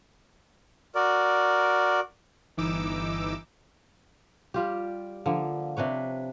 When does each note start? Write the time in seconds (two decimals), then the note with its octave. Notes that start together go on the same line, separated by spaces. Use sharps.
0.95 F#4 A#4 D5
2.57 G1 E3 D#4 D6 E6
4.54 G3 F4 G4
5.26 D3 F3 A#3
5.77 C3 D4 B4 C#5